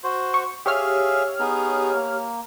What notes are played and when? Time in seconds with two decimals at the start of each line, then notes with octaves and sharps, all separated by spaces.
0.04 F#4 C5
0.34 C#6
0.66 G4 G#4 C#5 E5 F5 F6
1.40 B3 D#4 G#4
1.95 A#3